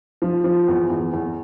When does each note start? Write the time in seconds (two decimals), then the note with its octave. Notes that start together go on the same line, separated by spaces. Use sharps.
0.22 F3
0.44 F3
0.68 E2
0.90 E2
1.13 E2